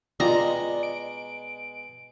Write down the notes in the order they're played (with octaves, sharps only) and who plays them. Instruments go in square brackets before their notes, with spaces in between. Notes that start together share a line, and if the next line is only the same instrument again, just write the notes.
[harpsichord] B2 G#3 [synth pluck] F4 G5 D#6 [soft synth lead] D5 [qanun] A#5
[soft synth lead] D7